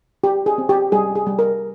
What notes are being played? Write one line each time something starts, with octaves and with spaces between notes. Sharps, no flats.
G4
G#4
C4
G4
G3 G#4
G#4
G3
A#4